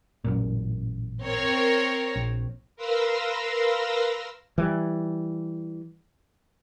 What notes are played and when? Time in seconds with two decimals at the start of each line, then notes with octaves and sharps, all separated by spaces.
0.24 A1 F#2 A#2
1.24 C4 A#4 C#5
2.16 A#1
2.76 A#4 B4 F5 C6 E6 A#6
4.58 E3 G3